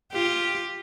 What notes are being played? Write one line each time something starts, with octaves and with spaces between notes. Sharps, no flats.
F4 G4